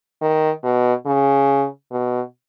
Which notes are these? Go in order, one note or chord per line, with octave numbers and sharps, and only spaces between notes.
D#3
B2
C#3
B2